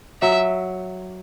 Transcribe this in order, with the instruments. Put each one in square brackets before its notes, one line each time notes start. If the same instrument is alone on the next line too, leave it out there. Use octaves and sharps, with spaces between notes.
[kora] F#3 [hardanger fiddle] E5